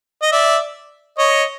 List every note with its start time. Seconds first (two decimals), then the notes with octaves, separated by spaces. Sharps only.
0.22 D#5
0.32 D5 E5
1.18 C#5 D#5